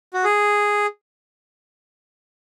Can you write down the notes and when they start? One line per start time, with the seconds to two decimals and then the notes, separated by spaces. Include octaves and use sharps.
0.14 F#4
0.24 G#4